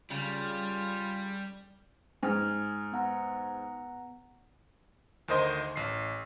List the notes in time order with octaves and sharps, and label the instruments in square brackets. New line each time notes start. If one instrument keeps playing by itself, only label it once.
[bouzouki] C#3 [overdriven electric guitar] G3 [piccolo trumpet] F4
[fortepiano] G#2 [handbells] G#5 F6
[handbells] B3 F#5 A#5
[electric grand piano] D2 D#3 C5 D#5 C6
A1 C7